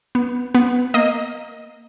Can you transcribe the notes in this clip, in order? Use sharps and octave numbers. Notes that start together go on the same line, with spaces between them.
B3
B3
A#3 D#5